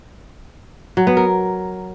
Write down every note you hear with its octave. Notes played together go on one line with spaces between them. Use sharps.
F#3
B3
A#4